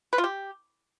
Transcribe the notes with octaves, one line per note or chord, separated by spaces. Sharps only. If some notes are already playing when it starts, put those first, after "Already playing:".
B4
F4
G4